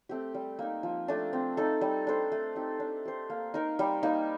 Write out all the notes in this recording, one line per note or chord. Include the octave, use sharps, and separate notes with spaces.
A3 C4 G4
G3
A#3 D#4
F3
A3 D4
C4
D#4 A4
G3
D4 A4 C5
A3
C4 D#4 G4
D4
G4 C5
A#3
D#4 A#4
G3
A#3 D#4